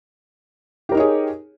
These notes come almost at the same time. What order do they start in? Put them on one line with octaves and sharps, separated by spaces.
G4 A#4 D#4 C#5 G#4